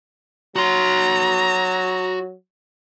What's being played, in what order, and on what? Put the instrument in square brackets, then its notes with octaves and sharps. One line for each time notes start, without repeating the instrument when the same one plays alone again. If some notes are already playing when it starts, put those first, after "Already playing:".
[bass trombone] F#3 [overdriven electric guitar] F#4 C6 [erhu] A#5